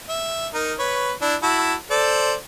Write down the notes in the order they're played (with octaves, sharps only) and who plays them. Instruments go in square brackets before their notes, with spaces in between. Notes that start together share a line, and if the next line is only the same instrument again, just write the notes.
[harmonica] E5
D#4 A#4
B4 C#5
D4 E4
E4 F#4 A5
A4 C5 D5